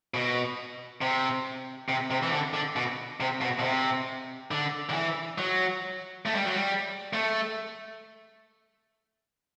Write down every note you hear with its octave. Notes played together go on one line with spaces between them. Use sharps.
B2
C3
C3
C3
E3
D3
D3
B2
C3
B2
B2
C3
D3
D3
E3
F#3
A3
G3
F#3
G3
A3